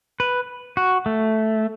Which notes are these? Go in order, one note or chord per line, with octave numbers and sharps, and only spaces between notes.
B4
F#4
A3